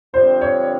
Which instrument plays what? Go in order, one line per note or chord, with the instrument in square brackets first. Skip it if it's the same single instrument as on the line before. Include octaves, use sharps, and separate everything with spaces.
[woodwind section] G2 D3 F3 G#3 C4 [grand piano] C5
[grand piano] C#5